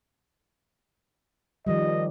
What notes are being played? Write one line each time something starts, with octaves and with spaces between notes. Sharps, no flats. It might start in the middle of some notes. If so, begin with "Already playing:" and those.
D#3 F3 G3 D#5